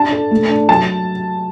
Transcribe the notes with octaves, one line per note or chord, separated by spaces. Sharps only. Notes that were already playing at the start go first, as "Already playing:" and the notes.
Already playing: D4 A5
A4
A3
D4
F#3 A5